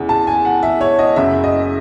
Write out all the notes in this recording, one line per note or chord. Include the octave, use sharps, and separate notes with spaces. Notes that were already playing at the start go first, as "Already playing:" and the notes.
Already playing: E2 C#3 G#3
A5
G#5
F#5
E5
C#5
D#5
F#1 F#2 C#3 E5
D#5